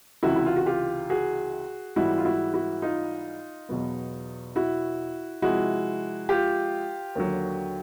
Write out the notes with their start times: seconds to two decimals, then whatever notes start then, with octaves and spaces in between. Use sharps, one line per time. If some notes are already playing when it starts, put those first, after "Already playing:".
0.23 C#2 C3 E3 E4 F#4
0.36 E4
0.46 F4
0.56 F#4
0.66 F4 G4
1.10 F#4 G#4
1.96 G#2 E3 G3 B3 E4 F#4
2.18 F4
2.25 E4 F#4
2.54 E4 F#4
2.82 D#4 F4
3.69 E2 B2 F#3 B3
4.56 E4 F#4
5.42 C3 F3 G#3 E4 F#4
6.29 F4 G4
7.16 D#2 D3 F#3